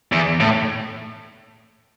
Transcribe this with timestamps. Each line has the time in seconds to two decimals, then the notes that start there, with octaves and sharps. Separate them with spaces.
0.12 E2
0.40 A2